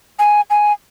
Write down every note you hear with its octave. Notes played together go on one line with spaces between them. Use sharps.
G#5
G#5